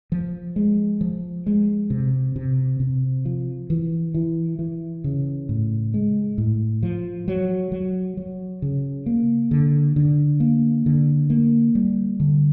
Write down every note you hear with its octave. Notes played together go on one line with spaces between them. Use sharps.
F3
G#3
F3
G#3
C3
C3
C3
F3
E3
E3
E3
C#3
A2
G#3
A2
F3
F#3
F#3
F#3
C#3
A#3
D3
D3
A#3
D3
A#3
G3
D3